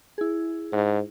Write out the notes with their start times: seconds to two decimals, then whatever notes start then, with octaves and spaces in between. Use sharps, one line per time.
0.18 E4 G#4
0.73 G#2